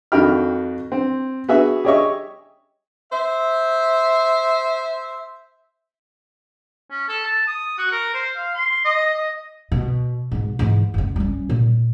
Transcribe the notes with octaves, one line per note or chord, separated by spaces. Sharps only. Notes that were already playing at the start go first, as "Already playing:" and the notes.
F2 D#3 F#4 G5 B5 F6
C4
B3 F#4 G#4 E5
G4 G#4 C#5 D#5 E5 C#6
C5 E5
C#4
A4
A5
D#6
F#4
A#4
C5
F5
C6
D#5
D#5
B2
G#2 B2
G#2 E3
F#1 C#2
G3 C#4
A#2